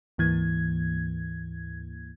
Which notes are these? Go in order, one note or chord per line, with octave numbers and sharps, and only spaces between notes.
D2 G#2 E3 A#3 G#6